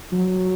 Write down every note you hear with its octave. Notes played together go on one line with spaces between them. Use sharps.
F#3